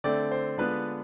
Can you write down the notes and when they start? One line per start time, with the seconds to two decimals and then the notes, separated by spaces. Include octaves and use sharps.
0.04 D3 A3 C4 D5
0.32 C5
0.58 D3 G#3 B3 D4 F4 B4